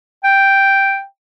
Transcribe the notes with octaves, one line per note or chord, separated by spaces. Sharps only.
G5